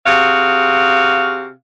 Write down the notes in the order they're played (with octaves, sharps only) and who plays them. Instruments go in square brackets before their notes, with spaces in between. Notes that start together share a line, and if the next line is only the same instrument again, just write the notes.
[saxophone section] C3 F#4 G#4 F5